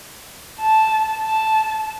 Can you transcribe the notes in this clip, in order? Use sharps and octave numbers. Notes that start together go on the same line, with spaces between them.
A5
A5